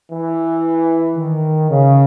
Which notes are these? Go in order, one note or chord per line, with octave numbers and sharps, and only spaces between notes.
E3
D#3
C#3